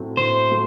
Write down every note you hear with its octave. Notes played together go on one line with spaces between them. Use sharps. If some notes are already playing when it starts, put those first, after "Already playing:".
Already playing: A2 F#3 A3 C4
A2 C5
F#3 A3